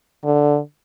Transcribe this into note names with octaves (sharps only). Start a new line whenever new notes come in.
D3